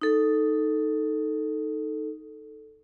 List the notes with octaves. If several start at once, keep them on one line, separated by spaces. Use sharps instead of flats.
D#4 A4